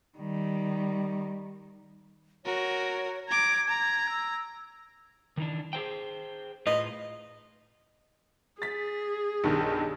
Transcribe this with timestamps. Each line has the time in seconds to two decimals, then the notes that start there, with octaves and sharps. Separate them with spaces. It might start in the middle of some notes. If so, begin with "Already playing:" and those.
0.18 D#3 G3
2.45 F#4 A#4 C#5
3.28 A#5 D6 G#6
3.67 A#5
4.10 E6
5.37 D#3 E3 D4
5.73 G#4 C5 G5
6.67 A2 F4 B4 D#5
8.62 G#4 A6 B6
9.44 B1 G2 D#3